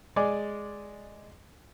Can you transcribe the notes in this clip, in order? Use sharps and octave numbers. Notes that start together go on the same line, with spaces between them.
G#3 D5 G#5 D6